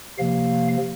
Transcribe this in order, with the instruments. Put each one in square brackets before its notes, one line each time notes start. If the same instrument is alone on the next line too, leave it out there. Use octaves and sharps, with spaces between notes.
[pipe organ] C3 F3 A#3 F5